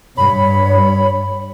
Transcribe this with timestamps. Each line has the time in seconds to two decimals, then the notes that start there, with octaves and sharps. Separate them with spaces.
0.17 G2 C#5 B5